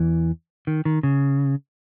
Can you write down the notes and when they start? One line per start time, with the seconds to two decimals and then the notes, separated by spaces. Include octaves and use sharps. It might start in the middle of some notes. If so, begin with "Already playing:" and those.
Already playing: E2 E3
0.67 D#3
0.85 D#3
1.03 C#3